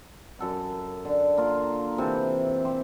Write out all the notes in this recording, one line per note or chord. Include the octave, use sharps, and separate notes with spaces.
F#2 A4 F#5
D3
A#3 F4 A#4
C3 E3 A4
G4 C5